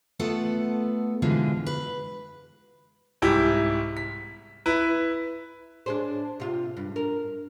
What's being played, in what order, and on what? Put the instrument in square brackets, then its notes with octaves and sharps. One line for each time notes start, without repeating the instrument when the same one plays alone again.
[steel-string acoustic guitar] A3 B3 F4 A4 F#5
B2 D3 E3 F3 G#3 F4
B4
[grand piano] C2 G#2 E4 G4
B6
E4 B4
[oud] D4 G#4 C5
C3 F4
G2
A#4